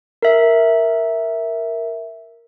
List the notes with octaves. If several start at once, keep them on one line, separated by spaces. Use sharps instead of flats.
A#4 E5